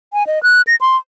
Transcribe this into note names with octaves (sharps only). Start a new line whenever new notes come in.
G#5
D#5
F#6
A#6
C6